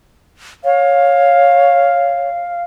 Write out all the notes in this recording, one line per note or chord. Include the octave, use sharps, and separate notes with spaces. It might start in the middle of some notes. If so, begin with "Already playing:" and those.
C#5 F5